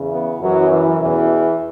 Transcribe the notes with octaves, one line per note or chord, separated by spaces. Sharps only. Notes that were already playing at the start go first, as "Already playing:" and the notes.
Already playing: E2 C#3 E3
B3
F#2 E3 F#3
E3
E2 B2 E3